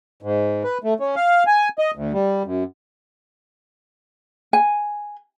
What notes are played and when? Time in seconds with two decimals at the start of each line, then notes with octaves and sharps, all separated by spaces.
0.23 G#2
0.64 B4
0.84 A3
1.00 C#4
1.16 F5
1.47 G#5
1.79 D#5
1.96 D2
2.13 G3
2.45 F#2
4.53 G#5